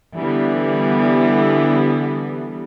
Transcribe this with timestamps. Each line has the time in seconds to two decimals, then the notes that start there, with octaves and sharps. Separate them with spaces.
0.16 D3 E3 G3 B3